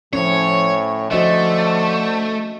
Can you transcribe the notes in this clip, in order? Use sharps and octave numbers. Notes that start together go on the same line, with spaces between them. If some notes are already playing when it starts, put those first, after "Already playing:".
A2 F3 C#4 C#5
D3 F3 A3 F#4 D#5 E5